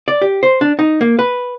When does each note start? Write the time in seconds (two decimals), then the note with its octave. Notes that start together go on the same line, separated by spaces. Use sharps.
0.08 D5
0.22 G4
0.43 C5
0.61 D4
0.79 D#4
1.01 A#3
1.19 B4